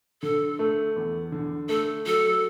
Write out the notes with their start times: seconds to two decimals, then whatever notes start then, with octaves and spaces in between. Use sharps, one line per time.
0.22 D3 A4
0.59 A3
0.96 E2
1.32 D3
1.69 A3 A4
2.06 F#3 A4